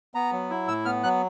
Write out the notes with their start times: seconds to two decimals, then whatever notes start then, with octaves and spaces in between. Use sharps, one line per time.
0.15 B3 A#5
0.32 F#3
0.50 E4
0.68 A2 E6
0.85 B3 F6
1.03 F#3 F#6